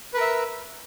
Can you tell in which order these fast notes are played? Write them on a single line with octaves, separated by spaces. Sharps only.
B4 A#4 E5